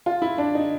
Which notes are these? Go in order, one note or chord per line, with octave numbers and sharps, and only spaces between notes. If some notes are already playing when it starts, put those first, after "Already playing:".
F4
E4
D4
D#4